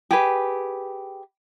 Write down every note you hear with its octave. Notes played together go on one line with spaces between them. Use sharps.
G4 G#4 B4